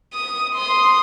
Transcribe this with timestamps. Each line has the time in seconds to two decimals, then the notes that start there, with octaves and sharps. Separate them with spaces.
0.13 D#6
0.55 C6 D#6